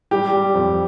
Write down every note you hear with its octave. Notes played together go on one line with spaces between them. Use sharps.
G3 G4
G3
F2